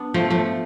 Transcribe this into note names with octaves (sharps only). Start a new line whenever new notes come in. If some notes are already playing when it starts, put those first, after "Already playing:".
Already playing: B3 D4
F3 A3
F3 A3